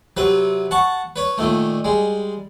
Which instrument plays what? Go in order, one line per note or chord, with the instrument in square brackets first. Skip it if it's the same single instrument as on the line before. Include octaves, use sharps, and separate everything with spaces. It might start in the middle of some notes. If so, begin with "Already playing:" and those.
[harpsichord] C3 F#3 B4
F#5 A5 C#6
B4 C#5
A#2 D#3 A3
G3 G#3